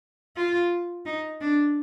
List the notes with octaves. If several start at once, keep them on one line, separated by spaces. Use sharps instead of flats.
F4
D#4
D4